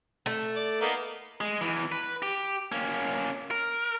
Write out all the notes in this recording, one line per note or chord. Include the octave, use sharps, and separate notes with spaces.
A3
D5
A#3 B3 D#4
G#3
E2 E3
B4
G4
A#3 C#4
A#4